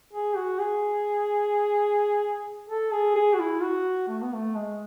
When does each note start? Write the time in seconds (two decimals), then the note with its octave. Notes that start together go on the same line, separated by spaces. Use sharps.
0.13 G#4
0.36 F#4
0.59 G#4
2.69 A4
2.92 G#4
3.15 G#4
3.34 F#4
3.39 E4
3.62 F#4
4.08 A3
4.22 B3
4.35 A3
4.56 G#3